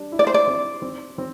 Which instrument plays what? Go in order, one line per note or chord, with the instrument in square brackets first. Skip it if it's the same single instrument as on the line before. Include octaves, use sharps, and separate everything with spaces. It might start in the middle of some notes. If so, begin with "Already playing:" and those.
Already playing: [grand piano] G3 D4
E4
[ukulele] D5
C5
D5
[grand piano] C4
C4
C4